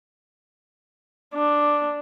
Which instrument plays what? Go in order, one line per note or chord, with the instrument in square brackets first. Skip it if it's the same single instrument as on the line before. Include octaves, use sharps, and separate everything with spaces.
[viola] D4